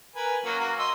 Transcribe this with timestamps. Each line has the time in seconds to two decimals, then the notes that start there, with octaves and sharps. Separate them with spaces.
0.16 A#4 B4 G#5
0.45 F#3 A#3 C#4
0.60 A#3 F#4
0.79 D#5 C6 E6